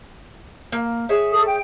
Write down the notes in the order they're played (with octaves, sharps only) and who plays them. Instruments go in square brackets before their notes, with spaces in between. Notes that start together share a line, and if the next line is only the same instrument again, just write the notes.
[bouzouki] A#3
G#4 C#5 E5
[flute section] A4 D#6
G5